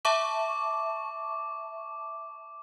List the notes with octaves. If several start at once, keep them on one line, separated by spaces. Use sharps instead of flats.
E5 A5 C#6 D6